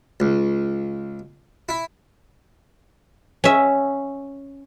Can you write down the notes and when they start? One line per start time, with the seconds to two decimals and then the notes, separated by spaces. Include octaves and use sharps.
0.20 C#2
1.69 E4
3.44 C#4 E5